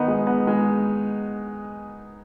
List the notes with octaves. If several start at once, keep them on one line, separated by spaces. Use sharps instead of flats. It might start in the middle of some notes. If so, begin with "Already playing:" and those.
Already playing: D#3 B3 D#4
G#3
B3
G#3